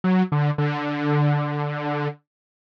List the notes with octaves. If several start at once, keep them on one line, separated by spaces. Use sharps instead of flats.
F#3
D3
D3